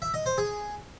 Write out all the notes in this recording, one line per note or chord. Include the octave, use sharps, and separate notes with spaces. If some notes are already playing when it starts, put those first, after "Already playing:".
E5
D#5
C5
G#4